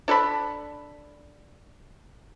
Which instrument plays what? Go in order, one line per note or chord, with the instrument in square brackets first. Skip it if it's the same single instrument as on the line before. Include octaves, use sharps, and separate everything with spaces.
[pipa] D4 A4 A5 B5